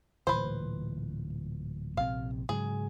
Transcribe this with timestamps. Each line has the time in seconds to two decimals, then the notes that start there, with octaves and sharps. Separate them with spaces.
0.27 D1 A#2 E3 B4 C5
1.97 A#1 C3 C4 F5
2.49 G#2 C#3 F#3 G#4